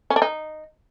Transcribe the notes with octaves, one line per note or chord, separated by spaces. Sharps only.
C#4
D4
D#4